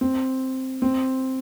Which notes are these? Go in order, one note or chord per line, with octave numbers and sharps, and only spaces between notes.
C4
C4